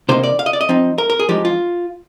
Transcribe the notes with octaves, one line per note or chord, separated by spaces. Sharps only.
C3 D#3 A#3 D#4 C5
D5
F5
D#5
D5
D#5
F3 C4 D#4
A#4
A#4
G#4
F3 G#3 D#4 G4
F4